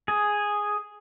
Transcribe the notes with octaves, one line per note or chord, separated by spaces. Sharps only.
G#4